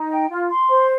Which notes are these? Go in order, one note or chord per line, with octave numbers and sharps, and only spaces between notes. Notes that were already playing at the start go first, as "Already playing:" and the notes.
Already playing: D#4
G5
F4
C6
C5